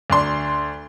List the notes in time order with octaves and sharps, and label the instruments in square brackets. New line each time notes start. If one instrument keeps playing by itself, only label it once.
[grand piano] D2 D4 C6